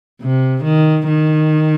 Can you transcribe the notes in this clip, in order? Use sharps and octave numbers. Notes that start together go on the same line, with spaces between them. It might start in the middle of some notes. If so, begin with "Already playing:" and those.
C3
D#3
D#3